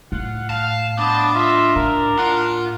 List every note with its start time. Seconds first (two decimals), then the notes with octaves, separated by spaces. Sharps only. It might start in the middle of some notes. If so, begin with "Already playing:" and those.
0.12 A2 F4 F#5
0.50 F5 A5
0.99 B3 D4 C5 D#5 A5
1.35 F4 D#5 E5
1.76 A2 A#4
2.18 D4 F4 F#5